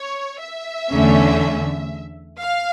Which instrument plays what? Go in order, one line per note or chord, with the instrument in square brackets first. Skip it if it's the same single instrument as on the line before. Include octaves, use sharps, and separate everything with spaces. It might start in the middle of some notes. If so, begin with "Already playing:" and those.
Already playing: [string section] C#5
E5
E2 D3 A3 C#4
F5